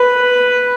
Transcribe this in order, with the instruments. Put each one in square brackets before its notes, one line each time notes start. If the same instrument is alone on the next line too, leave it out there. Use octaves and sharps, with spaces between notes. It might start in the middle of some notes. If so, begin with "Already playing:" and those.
Already playing: [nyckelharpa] B4